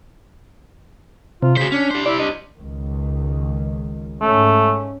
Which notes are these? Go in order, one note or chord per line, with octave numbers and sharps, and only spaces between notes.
C3 F4
C#3 F#4 C5 B6
C#4 D4
G3 C5
E4 D5
D4 D#5
C#2 D#3
G#2 A3 C#4